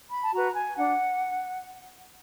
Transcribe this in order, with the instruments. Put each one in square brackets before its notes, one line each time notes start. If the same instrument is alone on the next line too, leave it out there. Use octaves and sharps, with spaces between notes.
[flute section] B5
A5
F#4 B4 A#5
G#5
D4 F#5